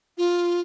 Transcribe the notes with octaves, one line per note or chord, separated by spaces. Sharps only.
F4